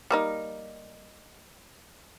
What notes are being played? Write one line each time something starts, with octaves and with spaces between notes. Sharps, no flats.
G3 A#3 D#4